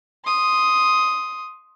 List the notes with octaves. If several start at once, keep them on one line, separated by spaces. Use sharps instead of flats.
C6 D#6